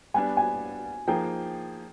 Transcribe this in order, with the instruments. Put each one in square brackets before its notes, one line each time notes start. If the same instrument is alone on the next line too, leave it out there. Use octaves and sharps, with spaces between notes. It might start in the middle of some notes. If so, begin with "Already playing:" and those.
[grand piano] G3 B3 D4 [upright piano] G#5
[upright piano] G#5
[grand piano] F3 A#3 D#4 G#4 [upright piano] G5